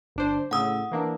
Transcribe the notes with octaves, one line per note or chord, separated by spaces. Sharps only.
G1 D4 C5
A2 C#3 F#5 D#6 E6
E3 A#3 D4